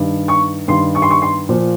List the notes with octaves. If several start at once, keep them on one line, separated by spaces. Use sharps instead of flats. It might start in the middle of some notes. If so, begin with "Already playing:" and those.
Already playing: G2 D#3
C#6
G2 D#3 C6
C#6
C6
C#6
C6
A#2 F3